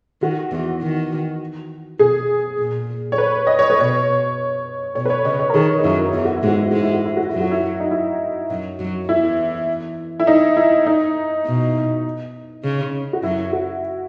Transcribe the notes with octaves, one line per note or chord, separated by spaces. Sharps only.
D#3 F#4
E2 E3
D#3
B2 G#4
A#2
C#5
B4
D#5
C#5
B4
B2 C#5
B2 C#5
B4
C#5
C#3 D#5
C#5
A#4
D#3 G#4
D#4
F#2 F#3 E4
E2 E3 E4
F#4
E4
G#2 G#3
F#4
E4
G#2 G#3 F#4
E4
F#4
E4
F#4
F#2 F#3 E4
F#4
E4
D#4
E4
F#2 F#3
F#2 F#3
E2 E3 E4
E4
D#4
E4
D#4
B2
C#3
F#4
F#2 F#3 E4
F#4